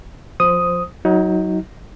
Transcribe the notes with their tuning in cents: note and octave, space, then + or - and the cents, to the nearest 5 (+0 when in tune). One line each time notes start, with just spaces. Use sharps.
F3 +15 C5 +0 D#6 +0
F#3 +5 D#4 +30